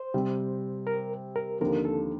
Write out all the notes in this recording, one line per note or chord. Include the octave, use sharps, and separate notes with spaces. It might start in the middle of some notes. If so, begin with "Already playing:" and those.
Already playing: C5
C3 G3 C4
A#4
A#4
D#2 D3 F3 C4 A#4
A4